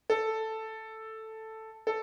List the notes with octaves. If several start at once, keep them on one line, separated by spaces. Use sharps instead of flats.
A4
A4